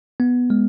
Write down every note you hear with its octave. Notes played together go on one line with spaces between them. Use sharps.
B3
G#3